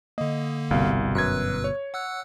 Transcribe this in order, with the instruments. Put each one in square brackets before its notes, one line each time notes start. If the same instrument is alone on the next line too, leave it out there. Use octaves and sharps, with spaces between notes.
[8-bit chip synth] D3 A#3 [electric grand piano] D#5
[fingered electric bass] G1 B2 [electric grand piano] C2 F5
[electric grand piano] F#2 G#6 [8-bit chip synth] B4 E6 F#6
[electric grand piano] C#5
[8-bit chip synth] F#5 E6 F#6